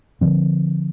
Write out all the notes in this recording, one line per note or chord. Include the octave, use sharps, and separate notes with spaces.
D3 F3 C4